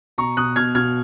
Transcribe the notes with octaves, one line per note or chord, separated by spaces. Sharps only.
B2 A#5 C#6
B2 D#6 F#6
B2 F6 G#6
B2 F6 G#6